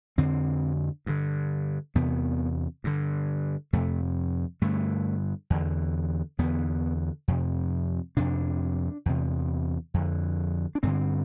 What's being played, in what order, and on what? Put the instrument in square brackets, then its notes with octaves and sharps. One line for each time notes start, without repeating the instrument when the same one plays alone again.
[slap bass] F2 D3 C4
G2 D3
E2 C3 B3
G2 D3
F2 C3 A3
G2 D3 A3
E2 D3
E2 D3 B3
F2 C3
F2 C3 D4
E2 C3
F2 D3
D4
G2 D3 C4